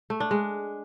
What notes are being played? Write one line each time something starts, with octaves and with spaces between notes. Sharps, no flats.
A3
D4
G#3